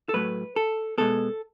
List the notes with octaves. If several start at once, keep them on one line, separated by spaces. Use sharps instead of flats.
A4
A2 F#3 A3 B4
A4
B2 G#3 B3 A4